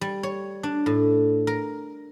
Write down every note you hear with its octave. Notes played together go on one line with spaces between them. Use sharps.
G3
C#5
D4
A2
A#4